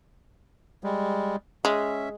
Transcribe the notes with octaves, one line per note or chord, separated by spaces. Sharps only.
G3 G#3
G#3 C#4 E5